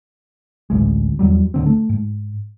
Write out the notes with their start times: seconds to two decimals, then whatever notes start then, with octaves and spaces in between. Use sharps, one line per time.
0.70 A1 D2 G#3
1.19 E2 F#3 G3
1.54 D1 D3 C4
1.66 A3
1.89 G#2